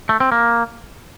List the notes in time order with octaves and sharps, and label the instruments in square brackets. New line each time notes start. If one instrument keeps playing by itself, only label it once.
[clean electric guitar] A3
C4
A#3